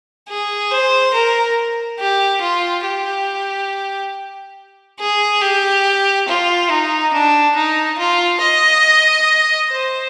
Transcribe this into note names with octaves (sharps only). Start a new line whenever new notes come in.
G#4
C5
A#4
G4
F4
G4
G#4
G4
F4
D#4
D4
D#4
F4
D#5
C5